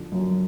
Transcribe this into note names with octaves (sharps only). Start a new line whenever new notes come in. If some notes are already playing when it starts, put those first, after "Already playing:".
Already playing: D3 F3
F#2